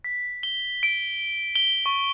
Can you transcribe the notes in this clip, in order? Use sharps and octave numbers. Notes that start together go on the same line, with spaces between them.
B6
G7
D7
G7
C#6